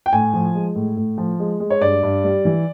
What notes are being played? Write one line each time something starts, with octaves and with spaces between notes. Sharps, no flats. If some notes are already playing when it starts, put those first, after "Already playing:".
G5
A2 G#5
F3
G#3
A2
A2
F3
G#3
G#3
C#5
G2 D5
G2
G3
E3